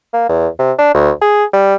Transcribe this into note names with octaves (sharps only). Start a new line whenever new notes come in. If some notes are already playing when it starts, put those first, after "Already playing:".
A#3
E2
C3
D4
D2
G#4
G3